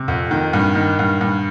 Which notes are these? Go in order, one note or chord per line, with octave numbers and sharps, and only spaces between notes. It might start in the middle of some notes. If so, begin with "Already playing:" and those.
Already playing: C3
F2
D#3
G2
D#3
G2
G2